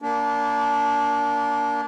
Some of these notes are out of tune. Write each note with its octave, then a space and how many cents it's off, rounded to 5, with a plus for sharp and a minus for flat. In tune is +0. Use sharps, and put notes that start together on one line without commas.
A#3 +0 D4 -25